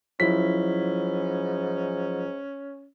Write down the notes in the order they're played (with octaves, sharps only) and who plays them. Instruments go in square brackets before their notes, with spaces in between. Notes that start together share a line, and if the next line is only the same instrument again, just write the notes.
[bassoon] G#2 [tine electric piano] F3 F#3 F4 [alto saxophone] C#4 [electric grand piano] E4 B6